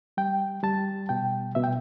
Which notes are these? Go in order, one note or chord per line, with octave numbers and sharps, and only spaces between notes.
G3 G5
G3 A5
B2 G5
B2 E5
G5